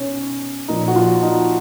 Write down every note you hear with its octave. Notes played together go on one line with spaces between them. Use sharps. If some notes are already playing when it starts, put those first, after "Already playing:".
Already playing: B2 C#4 D#4
A#2 F3 D#4
F#4
F3 F4
D#4